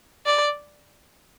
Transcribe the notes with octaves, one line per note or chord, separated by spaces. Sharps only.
D5